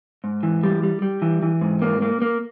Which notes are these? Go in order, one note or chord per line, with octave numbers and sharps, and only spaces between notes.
G#2
E3
G3
G3
G3
E3
E3
G#2
A#3
A#3
A#3